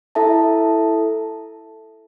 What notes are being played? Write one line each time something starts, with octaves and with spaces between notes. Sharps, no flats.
E4 A4 E5 A5